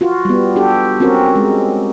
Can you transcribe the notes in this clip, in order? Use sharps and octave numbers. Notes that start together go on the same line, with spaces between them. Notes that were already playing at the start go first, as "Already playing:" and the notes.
F4 F#4
G3 B3
D4 F#4 G4 A4
C4 C#4 F#4 A#4
G#3